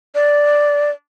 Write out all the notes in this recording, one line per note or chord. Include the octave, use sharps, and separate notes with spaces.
D5